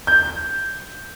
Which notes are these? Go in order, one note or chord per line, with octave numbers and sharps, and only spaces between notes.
G6